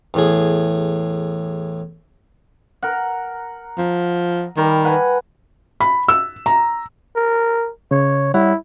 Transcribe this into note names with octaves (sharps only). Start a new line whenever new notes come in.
E2 A2 G#4
A#4 F#5
F3
D#3 G3 A#4
B4 F#5 G#5
B5
E6
A#5
A#4
C#3 C#5
G3 E4 C#5 F#5